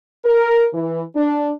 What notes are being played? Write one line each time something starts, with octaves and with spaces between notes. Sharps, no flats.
A#4
E3
D4